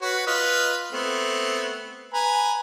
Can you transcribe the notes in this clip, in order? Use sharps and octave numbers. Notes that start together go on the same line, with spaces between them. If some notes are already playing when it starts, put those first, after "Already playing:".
F#4 B4 C#5
F4 B4 D#5
A3 B3 C4
B4 G#5 A#5